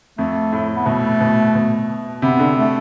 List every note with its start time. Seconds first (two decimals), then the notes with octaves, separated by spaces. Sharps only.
0.18 F2 A3
0.53 A2
0.76 B3
0.86 B2 A3
1.20 B2
1.55 B2
2.22 C3 B3
2.39 D3
2.57 A3